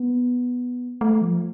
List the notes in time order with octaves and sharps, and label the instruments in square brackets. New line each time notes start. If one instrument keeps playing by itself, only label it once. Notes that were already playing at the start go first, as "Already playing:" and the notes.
Already playing: [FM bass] B3
A3
F3